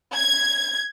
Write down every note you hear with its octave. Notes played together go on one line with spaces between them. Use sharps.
G#6